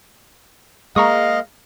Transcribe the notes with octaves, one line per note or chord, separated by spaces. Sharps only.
G#3 A#3 D#5 F5 A#5 C#6 D#6